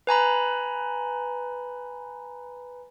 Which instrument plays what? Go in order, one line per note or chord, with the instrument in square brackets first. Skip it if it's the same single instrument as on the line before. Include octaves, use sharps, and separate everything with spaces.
[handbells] B4 G#5 A#5 B5